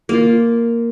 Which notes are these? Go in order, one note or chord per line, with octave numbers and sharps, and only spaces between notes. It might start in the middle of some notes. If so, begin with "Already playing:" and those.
A#3 F4